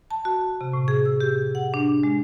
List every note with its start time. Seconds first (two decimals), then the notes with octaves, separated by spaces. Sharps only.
0.11 A5
0.25 F#4
0.61 C3
0.73 A2
0.88 G#4
1.05 E6
1.21 G4
1.55 F#5
1.74 D4
2.03 G#3